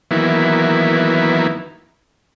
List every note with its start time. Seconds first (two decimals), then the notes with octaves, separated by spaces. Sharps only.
0.11 D#3 E3 F#3 A#3 B3 E4